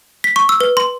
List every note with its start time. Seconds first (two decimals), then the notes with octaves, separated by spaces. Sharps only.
0.24 B6
0.36 C#6
0.49 E6
0.61 B4
0.77 C6